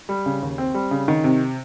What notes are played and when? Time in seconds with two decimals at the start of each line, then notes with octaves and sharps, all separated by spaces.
0.09 G3
0.26 C#3
0.42 D#2
0.58 C4
0.74 G3
0.91 C#3
1.08 D#3
1.24 C3